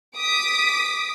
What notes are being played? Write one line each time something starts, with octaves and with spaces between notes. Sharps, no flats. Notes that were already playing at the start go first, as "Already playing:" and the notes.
D6 D#6 B6